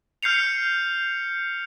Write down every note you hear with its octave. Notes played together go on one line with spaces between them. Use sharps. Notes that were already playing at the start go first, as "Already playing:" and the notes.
F6 G6 C7 C#7 F7